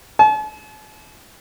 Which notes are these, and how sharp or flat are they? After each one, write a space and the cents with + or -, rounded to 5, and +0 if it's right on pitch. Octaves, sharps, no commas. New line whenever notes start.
A5 -45